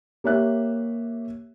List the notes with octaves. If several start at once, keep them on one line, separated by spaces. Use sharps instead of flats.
A#3 G4 C#5 E5 F#6